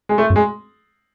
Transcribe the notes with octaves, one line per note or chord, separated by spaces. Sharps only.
G#3
A3
F#2
G#3